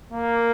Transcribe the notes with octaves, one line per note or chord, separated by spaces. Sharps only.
A#3